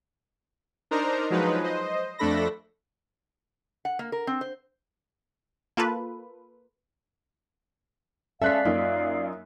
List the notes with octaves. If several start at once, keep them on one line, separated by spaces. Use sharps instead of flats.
D4 D#4 A#4 C5 A#5
F3 F#3 G#3 D#4 B4
C5 D#5
F2 A3 D4 A4 B5 A#6
F#5
A#3
A#4
C4
C5
A#3 F4 A4 B4
G#3 C#4 A4 D5 E5 F5 F#6 B6
F#2 A#3 D#4 F4